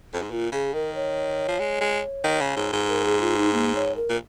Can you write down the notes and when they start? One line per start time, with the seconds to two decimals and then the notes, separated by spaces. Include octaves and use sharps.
0.14 F2
0.22 G#2
0.31 A#2 F4
0.52 C#3 G#4
0.74 D#3 A#4
0.95 C#5
1.48 F3
1.59 G#3
1.81 G#3
2.24 D#3
2.41 C#3
2.56 G#2
2.73 G#2
2.89 A#4
3.05 G#4
3.21 F4
3.37 D#4
3.53 A#3
3.75 C#5
3.96 A#4
4.10 A#2